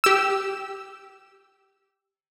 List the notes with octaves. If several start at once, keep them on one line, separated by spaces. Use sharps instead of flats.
G4 E6